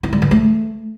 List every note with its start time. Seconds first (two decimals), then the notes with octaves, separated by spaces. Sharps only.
0.03 E4
0.13 G3
0.22 E3
0.31 A3